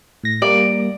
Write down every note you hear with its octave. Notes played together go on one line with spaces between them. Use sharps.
A2 A#6
G3 A#3 D5